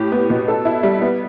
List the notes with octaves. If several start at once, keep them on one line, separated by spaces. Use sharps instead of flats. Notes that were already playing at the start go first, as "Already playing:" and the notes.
Already playing: A2 G4
B3
B2
A4
E4
G3
B3